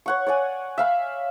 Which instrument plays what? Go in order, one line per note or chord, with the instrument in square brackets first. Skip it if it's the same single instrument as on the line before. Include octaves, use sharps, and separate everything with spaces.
[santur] C#5 F#5 C#6
C#5 D5 F#5 G#5
E5 F5 B5